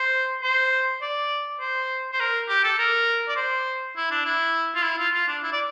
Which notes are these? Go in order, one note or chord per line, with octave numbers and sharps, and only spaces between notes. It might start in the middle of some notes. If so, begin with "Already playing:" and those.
Already playing: C5
C5
D5
C5
C5
A#4
G4
A4
A#4
D5
C5
E4
D4
E4
F4
E4
F4
F4
D4
E4
D5